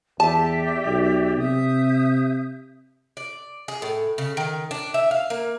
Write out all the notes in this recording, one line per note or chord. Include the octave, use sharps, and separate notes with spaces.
E2 G4 D5 E5 A5
B1
C3 E5 D#6 G6
D5
G#4
A2
C#3
D#3
D4
E5
F5
A#3